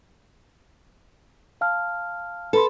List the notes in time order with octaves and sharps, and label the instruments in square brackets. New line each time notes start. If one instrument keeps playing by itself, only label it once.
[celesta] F5 A5 F6
[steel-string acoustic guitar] A4 [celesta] B4 B5 C6